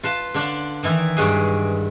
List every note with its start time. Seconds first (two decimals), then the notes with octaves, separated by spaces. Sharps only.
0.03 F4 B4 A5
0.34 D3 D4 F4
0.83 D#3 E3 E4 A#4
1.17 G2 G3 G#3 F#4 G#4